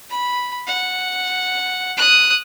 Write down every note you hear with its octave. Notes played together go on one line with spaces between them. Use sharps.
B5
F#5
D#6 F#6